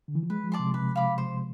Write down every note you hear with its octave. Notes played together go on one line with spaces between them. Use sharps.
D3
E3
F3
G#3 B4
F3
D5 A5 C6
C3
C3 B4
F5 B5 D6
C5